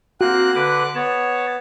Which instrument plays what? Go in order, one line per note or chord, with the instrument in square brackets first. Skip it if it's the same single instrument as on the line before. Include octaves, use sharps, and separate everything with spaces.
[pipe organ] A#3 C4 [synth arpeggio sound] F#4 [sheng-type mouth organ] F#5 F#6
[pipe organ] D3 B4 D6
[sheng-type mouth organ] B3 [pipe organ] C#5 A5